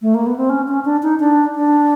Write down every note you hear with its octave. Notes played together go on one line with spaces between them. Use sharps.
A3
A#3
B3
C4
C#4
C#4
D4
D#4
D4
D4